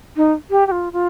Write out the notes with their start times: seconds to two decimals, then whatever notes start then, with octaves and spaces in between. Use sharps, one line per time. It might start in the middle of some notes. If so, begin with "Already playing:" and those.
0.17 D#4
0.51 G4
0.67 G4
0.71 F4
0.93 F4